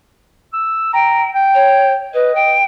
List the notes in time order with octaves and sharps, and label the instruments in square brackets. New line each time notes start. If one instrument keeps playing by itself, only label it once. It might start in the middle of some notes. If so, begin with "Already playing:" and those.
[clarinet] E6
[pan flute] G5 [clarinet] A#5
[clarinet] G5
[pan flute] C#5
[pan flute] B4 [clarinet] D#5
[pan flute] G5